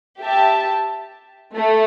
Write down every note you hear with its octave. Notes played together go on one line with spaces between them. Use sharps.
G4 E5 A5
A3